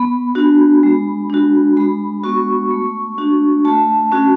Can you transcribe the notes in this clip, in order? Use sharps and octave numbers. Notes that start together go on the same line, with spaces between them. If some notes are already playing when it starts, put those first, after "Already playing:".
Already playing: B3 B5
D4 F#4
G#3
D4 F#4
G#3 B5
B3 F#4 C#6
A3
D4 F#4
A3 A5
C#4 F#4